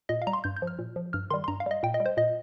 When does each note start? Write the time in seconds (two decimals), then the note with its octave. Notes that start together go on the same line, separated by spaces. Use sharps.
0.09 A#2 D#5
0.22 F5
0.27 G3 A#5
0.33 C6
0.44 G2 G6
0.57 G6
0.62 F3
0.67 F6
0.79 A#2
0.96 F3
1.13 G2 F6
1.30 D#3 G3 C6
1.44 C6
1.48 G2 A#5
1.60 F5
1.66 G3 D#5
1.83 A#2 G5
1.94 D#5
2.00 G3
2.06 C5
2.17 A#2 D#5